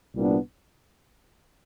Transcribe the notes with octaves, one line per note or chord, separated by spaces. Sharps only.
C2 A#2 G3 B3 D4